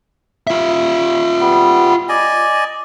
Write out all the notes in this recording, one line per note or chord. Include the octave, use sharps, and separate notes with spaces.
F4 E5
G3 B3
D5 D#5 G#5